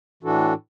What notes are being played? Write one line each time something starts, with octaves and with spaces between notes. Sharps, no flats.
A2 E3 D4 F#4 A4